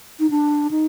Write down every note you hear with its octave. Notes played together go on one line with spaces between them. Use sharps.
D#4
D4
D#4